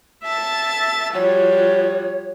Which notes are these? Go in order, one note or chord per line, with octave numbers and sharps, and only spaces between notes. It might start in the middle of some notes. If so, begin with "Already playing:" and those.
E5 A5 A6
F3 G3 F#4 C#5